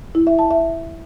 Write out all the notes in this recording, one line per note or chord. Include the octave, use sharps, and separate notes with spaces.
E4
E5
A5
E5